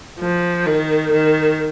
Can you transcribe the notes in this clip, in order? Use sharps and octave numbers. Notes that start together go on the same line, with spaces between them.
F3
D#3
D#3